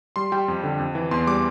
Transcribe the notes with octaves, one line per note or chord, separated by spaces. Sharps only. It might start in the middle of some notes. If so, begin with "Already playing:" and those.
G3 C6
G3 G5
F2
D3
F2
E3
E2 C6
G3 D6